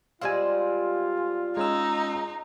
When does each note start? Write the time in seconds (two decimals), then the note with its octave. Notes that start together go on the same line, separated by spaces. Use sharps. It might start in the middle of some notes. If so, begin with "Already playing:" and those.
0.22 G3 G#3 C4 F4 F5 G#5
1.57 G#3 C#4 D#4 E6